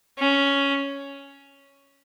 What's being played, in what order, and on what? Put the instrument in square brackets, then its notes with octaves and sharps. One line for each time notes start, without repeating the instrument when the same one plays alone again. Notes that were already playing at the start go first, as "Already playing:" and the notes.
[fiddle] C#4